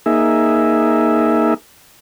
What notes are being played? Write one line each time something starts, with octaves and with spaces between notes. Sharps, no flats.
A#3 D#4 G#4 E5